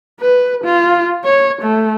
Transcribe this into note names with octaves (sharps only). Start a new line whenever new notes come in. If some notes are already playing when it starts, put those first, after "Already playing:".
B4
F4
C#5
A3